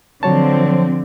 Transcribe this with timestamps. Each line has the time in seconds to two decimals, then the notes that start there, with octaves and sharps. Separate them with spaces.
0.23 D3 F3 F#3 C4 C#5 A5